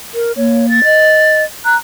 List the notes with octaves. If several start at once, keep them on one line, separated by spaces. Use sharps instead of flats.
A#4
A#3 C#5
A6
D#5
A#5 F#6